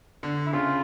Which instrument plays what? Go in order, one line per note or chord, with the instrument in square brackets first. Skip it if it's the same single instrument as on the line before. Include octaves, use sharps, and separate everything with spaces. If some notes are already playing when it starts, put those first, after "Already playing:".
[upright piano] D3
[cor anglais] E4
[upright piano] C#3 [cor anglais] F4